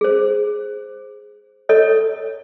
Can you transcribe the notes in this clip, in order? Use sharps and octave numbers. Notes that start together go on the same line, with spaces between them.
G#4 C5
A4 C#5 D#5